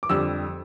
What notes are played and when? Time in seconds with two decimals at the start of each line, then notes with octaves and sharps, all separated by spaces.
0.03 D6
0.09 F2 D3 G3 E6